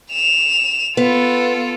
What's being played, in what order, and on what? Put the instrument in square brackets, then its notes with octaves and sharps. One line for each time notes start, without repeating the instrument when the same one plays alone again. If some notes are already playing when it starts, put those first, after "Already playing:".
[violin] E7 F7
[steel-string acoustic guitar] B3 [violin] F4 A4